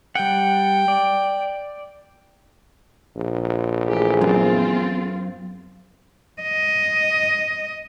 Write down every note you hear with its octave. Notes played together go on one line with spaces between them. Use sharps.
G3 F#5 G5
D5
A#1
E3 A3 G4 G#4
F#2 B3 C4 F4
D#5